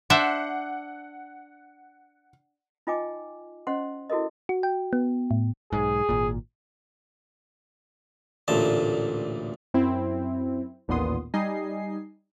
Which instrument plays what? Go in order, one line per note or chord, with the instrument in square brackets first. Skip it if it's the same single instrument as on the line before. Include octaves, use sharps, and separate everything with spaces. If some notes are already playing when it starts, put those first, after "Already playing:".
[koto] D4 C5 E5 [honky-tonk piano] F#5
[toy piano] D#4 F4 D#5 G5 G#5 D6
C#4 C5 D#5 F#5 C6
E4 F#4 A4 A#4 D#5
[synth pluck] F#4
G5
B3
A2
[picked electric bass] B1 G#2 [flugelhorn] G#4
[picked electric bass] G#1 A#2
[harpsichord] A1 D2 A#2 A5
[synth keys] F#2 C4 E4
A1 D#2 A#2 B3 C6 D#6
G3 D#4 D#5 G#5 C7